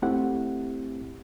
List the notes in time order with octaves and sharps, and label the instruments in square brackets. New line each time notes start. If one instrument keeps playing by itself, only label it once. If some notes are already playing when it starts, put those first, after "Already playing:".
[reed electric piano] A3 C4 E4 G4 F#5